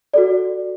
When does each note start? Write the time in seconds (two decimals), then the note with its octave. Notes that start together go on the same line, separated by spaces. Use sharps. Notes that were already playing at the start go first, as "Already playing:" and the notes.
0.14 F#4 A4 D5